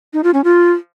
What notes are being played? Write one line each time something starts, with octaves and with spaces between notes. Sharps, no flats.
D#4
F4
C#4
F4